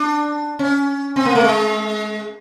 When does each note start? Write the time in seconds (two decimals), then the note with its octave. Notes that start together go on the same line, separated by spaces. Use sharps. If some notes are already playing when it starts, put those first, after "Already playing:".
Already playing: D4
0.59 C#4
1.16 C4
1.25 A#3
1.35 A3
1.44 G#3